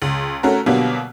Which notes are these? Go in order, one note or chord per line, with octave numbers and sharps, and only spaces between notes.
C#2
A3 C#4 F#4 A#4
B2 D3 F#3 G3 A#3 B3